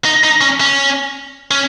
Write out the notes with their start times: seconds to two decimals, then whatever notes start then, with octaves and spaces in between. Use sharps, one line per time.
0.05 D#4
0.24 D#4
0.41 C#4
0.60 C#4
1.51 C#4